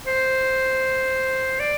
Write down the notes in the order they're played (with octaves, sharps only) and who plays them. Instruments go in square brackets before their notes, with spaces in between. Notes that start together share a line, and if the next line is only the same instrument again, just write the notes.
[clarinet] C5
D5